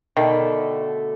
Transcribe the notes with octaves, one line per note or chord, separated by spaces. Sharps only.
B2 D3 D#3 A3